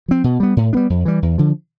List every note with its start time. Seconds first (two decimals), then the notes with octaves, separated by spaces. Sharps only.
0.08 F3 C4
0.24 B2
0.40 G3 B3
0.57 A2
0.73 G3 B3 D4
0.90 F2
1.05 E3 G3
1.22 E2
1.38 D3 F3